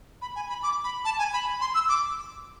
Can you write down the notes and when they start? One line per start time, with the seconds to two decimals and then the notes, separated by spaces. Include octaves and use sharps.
0.22 B5
0.36 G#5
0.49 B5
0.63 D6
0.84 B5
1.05 A5
1.19 G#5
1.33 B5
1.61 C6
1.74 E6
1.89 D6